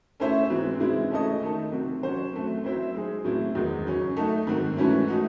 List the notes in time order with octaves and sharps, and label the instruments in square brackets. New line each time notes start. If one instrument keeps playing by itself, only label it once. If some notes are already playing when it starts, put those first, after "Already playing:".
[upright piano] A3 C#4 E4 C5 E5
G#2 E3 G#3 C4
C3 E3 G#3 C4 E4
A3 C#4 E4 A4 D#5
D#3 A3 D#4 A4
C3 F#3 C4 F#4
F#3 C#4 F#4 C5
F#3 A3 C4
F#3 C4 E4 C5 E5
G#3 D#4 G#4
A2 F#3 C4 E4
E2 D#3 G#3 D#4
C#3 F#3 C#4
A3 D#4 F#4 A4
G#2 D#3 F#3 C4 F#4
G#2 E3 A3 C#4 E4
A3 D#4 F#4